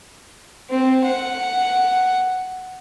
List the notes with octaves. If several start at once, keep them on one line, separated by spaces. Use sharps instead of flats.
C4
F#5